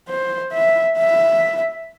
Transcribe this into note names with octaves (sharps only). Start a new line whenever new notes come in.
C5
E5
E5